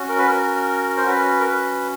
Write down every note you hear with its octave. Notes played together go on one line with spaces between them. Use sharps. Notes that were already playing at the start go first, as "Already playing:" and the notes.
Already playing: C#4 F#4
A#4
B4
A#4
C5
C#4 F#4 B4
A#4
B4